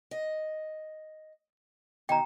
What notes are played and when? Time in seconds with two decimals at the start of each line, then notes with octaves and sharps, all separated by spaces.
0.11 D#5
2.09 B2 D#3 G5 A#5